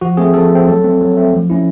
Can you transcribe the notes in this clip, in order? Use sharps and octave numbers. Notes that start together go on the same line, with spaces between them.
F3 F#4
A3 C4 G#4
F3 A4
A3 C4
F#3 A4
A3 C4
F#3
A3 C4
F3
A3 C#4 E4